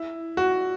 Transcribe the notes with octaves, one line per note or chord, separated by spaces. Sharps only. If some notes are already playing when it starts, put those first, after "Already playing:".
Already playing: E4
F#4